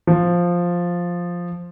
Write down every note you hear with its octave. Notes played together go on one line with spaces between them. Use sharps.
F3